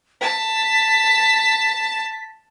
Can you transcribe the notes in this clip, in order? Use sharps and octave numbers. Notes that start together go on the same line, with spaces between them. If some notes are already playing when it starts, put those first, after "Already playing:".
A5 B6